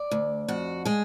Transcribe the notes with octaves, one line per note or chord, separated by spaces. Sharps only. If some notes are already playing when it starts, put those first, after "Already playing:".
Already playing: D5
D2
F2 F#4
G#3 G#4